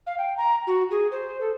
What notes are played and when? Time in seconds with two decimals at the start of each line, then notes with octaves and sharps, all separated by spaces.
0.07 F5
0.18 G5
0.37 A#5
0.67 F#4
0.91 G#4
1.12 C5
1.41 A4